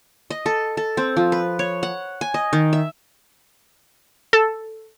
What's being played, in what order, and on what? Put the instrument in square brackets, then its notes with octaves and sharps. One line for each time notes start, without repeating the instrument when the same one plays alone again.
[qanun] D#5
A4
A4
C4
F3
B4
C#5
F#5
G#5
D#5
D#3
E5
[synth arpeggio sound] A4